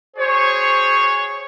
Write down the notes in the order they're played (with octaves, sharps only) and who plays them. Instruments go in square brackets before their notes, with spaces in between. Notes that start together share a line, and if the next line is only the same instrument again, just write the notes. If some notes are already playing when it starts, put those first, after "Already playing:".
[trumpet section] F#4 G#4 C#5 [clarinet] C5